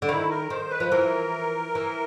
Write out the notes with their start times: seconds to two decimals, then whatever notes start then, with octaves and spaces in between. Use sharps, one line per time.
0.02 D3
0.08 D#3 E4
0.30 A#4
0.50 D#3 C5
0.70 B4
0.80 F3
0.91 E3 A#4
1.75 E3